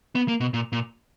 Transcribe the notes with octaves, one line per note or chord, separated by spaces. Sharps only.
B3
A#3
B2
A#2
A#2